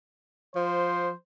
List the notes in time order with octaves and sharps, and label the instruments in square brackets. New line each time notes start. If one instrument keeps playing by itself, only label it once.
[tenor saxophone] F3 [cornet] C5